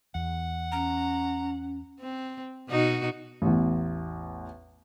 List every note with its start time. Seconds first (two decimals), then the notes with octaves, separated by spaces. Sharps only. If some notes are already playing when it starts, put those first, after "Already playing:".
0.15 E2 F#5
0.72 C#4 A#5
2.00 C4
2.68 B2 D#4 F#4
3.42 A1 E2